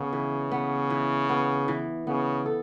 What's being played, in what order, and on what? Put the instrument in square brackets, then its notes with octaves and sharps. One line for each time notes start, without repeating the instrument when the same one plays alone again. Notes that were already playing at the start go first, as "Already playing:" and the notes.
Already playing: [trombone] C#3 [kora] B3
[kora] E3
B3
E3
B3
E3
[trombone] C#3 [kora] B3
[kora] A4